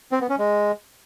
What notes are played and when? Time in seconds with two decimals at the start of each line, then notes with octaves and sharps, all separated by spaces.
0.12 C4
0.21 B3
0.30 C#4
0.39 G#3